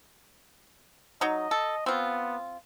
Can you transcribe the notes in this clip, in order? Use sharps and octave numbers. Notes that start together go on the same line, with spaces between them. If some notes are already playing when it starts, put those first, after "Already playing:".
F#3 D#4 D#5
A4
B3 C4 F4